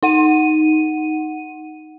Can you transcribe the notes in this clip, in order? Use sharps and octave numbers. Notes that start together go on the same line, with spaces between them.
D#4 F#5 D#7